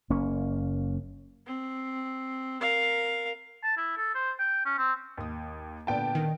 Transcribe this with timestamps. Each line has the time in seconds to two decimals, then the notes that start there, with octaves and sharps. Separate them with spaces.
0.10 F#1 A#3 C#4
1.46 C4
2.61 A#4 F5
3.63 A5
3.77 E4
3.98 A4
4.15 C5
4.39 G5
4.66 C#4
4.78 C4
5.17 D#2 D#6
5.87 A#2 D3 B3 D5 G5 A5
6.15 D#3